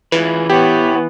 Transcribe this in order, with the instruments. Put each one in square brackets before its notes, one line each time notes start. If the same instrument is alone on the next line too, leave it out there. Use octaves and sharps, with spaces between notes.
[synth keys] E3 [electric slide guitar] F4 G#4 B4
[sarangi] B3 [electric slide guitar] E4 C#5 [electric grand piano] G4